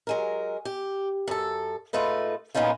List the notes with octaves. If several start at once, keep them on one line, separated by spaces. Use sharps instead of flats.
F#3 G#3 A#4
G4
F#2 A4
G#2 A3 F4 B4 D#5
A#2 A#3 B3 C#4 D#4 F4